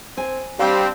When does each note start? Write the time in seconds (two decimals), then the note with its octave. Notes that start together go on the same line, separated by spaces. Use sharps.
0.17 C4 G#5
0.59 G3 C4 D4 F5